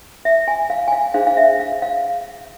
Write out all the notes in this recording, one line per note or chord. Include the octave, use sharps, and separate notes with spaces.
E5
G#5
F5
G#5
F5
D4 G#4 C5 F5
F5
E5
F5
F5